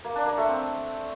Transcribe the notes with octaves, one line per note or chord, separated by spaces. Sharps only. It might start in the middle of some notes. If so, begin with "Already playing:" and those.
A#3
D4
A#3
A3
C4